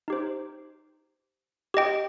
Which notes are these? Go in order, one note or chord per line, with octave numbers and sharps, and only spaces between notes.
D#4 G4 C5
G4 D#5 G5